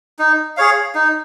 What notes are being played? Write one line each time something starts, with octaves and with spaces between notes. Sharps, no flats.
D#4
G#4 C#5 F5
D#4